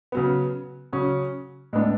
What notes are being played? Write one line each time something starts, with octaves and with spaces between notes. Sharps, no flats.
C#3 F#3 B3
C#3 F#3 C#4
A2 G#3 B3 D4